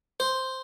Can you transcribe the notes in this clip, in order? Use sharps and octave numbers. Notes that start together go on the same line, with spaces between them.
C5